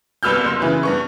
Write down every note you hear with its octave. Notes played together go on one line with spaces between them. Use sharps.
G1 C2 B4 E6 F6 G6
F#1 C6
C#3 E3 B4
G2 B3 C#6